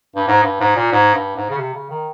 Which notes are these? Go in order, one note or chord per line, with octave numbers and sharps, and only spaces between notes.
G2
G#2
G2
G#2
A#2
G#2
G2
G#2
C#3
C3
C#3
D#3